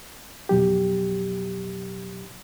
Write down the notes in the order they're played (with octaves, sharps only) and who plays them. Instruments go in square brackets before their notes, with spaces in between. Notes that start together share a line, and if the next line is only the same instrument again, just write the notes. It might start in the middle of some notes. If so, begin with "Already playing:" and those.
[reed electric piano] F2 B2 F#3 G4